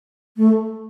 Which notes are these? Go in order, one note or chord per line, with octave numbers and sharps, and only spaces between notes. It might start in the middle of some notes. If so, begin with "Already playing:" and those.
A3